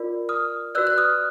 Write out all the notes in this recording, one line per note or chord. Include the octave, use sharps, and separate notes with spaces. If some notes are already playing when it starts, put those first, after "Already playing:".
Already playing: F4 A#4 D5
D#6 F6
F#4 B4 D5 E6 F#6
F#6
D#6 F6